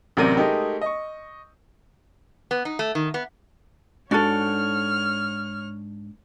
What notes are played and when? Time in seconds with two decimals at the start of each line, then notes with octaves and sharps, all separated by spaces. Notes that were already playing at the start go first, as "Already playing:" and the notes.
0.17 A1 C3 F#3 A#4 D5 D#7
0.36 G#3 A3 D#4 G4 A#4
0.81 D#5 C#6
2.51 B3
2.65 D#4
2.79 A3
2.95 D#3
3.14 B3
4.11 G#2 D4 F#4 A4 C#5 F6